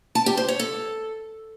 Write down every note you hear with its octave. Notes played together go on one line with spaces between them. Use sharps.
A5
G4
C5
C#5
A4